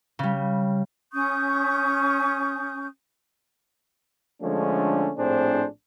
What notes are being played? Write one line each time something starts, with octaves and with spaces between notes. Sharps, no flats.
C#3 G3
C#4 C#6 D#6 G6
D3 F3 G#3 A3 C#4 D4
A#1 A2 C4 D4 G#4 C5